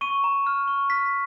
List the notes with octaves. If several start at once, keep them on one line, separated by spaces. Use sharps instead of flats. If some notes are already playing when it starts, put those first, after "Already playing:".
C#6 D#7
A#5
F6
C#6
F6 B6